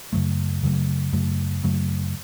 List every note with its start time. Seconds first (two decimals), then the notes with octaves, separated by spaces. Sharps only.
0.13 F#2 C#3 F#3 A3
0.63 F#2 C#3 F#3 A3
1.13 F#2 C#3 F#3 A3
1.64 F#2 C#3 F#3 A3